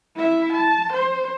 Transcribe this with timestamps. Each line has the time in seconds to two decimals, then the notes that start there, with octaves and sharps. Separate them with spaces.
0.15 E4 E5
0.53 A5
0.93 C5